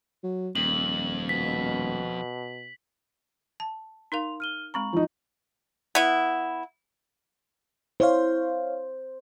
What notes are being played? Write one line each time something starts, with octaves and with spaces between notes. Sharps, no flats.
F#3
D#1 F2 F#7
B2 B6
A5
D#4 A#4 F5 C6 F7
F6 D#7 G7
G#3 C4 A#5 B5 C#6 F#7
F3 D#4
B3 E4
E4 C5 C#5 F5